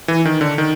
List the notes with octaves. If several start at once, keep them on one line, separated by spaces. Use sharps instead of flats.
E3
D#3
D3
D#3